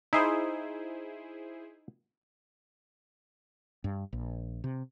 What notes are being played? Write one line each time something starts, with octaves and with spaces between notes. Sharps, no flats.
D#4 E4 G#4 C5
G2
A#1
C3